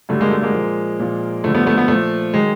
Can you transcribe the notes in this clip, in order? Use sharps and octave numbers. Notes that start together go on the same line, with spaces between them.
G2 D3 F#3 A3
G#3 A#3
A3
G#3 A#3
A#2 F3
A#2 F3
G2 D3 F3 A3
A3 B3
A3 B3
A3 B3
A#2 F3 A3
D#3 F#3 G#3